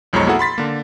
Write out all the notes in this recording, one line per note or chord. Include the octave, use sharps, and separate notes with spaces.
B1 F2 G#3 C#5 A#5 C#6
A#3 E4 F#4 G#4 A4 F#5
B5 C6 A6 B6
D3 A#3